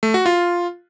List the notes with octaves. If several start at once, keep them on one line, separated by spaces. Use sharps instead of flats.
A3
F#4
F4